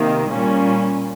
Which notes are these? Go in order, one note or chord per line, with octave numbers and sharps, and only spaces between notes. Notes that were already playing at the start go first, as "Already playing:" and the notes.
Already playing: C3 D#3 A#3
A#2 G3 C#4